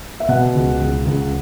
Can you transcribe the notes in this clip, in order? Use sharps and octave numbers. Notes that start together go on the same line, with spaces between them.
E5
B2 F#5
C#2
C#2
C#2